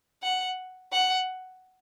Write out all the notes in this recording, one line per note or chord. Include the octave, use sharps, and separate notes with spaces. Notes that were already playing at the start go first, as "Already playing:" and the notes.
F#5
F#5